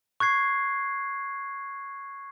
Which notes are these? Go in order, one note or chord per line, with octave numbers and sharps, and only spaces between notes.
C#6 F#6 G#6 C7